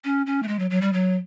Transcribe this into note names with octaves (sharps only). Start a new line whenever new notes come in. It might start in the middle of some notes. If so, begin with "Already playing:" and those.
C#4
C#4
A3
G#3
F#3
F#3
G3
F#3